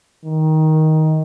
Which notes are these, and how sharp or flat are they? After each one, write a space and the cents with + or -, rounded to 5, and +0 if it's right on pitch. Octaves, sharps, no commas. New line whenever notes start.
D#3 +10